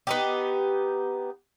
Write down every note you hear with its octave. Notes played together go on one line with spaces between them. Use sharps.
B3 D#4 G4